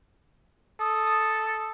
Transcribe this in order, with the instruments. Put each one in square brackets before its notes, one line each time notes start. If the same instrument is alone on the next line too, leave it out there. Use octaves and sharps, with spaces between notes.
[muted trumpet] A4 [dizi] D#6